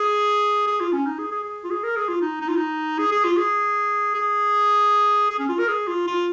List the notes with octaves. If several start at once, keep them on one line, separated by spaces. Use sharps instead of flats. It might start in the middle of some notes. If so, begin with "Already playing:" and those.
Already playing: G#4
G#4
F4
C#4
D#4
G#4
G#4
G#4
F4
G#4
A#4
G#4
F4
D#4
D#4
F4
D#4
G#4
G#4
F4
G#4
G#4
G#4
C#4
F4
A#4
G#4
F4
F4